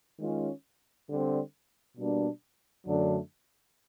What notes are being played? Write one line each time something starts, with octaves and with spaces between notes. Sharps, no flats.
D#3 G#3 C#4 F4
D3 G3 C4
B2 G3 A#3 D4
F#2 D3 F#3 A3 D4